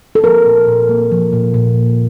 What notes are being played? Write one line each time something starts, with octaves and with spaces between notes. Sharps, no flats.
A4
F3 A#4
A#2
A#2
A#3
F3
A#2
A#2